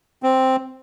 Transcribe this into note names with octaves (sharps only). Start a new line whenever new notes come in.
C4